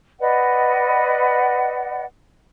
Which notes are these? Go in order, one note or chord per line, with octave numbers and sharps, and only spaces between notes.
B4 D5 D#5 F#5